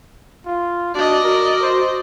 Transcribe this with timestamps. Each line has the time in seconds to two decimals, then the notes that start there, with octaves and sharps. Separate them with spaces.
0.46 F4
0.95 D4 F#4 D5 D#5
1.24 F#4 A#4
1.62 C5